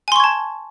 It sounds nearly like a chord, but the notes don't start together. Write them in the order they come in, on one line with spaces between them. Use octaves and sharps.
G#5 C6 C#6 G#6 A5